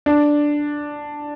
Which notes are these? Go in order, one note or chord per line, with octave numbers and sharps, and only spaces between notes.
D4